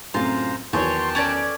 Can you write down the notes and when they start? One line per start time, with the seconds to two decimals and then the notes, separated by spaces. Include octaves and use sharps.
0.14 F#2 A2 C3 F4 C5 A#5
0.73 E2 D#3 F#3 C#5 G5 A5 C6
1.15 C#4 A4 D5 G#6